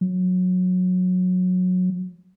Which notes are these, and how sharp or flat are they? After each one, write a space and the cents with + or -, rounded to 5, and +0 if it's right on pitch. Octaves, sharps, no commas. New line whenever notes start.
F#3 -20